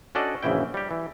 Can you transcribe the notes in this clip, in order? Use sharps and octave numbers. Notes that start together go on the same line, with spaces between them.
C#4 D4 F#4 A4 D5 D#5
A#1 F#2 C#3 E3 E4 G5
G3 G4
E3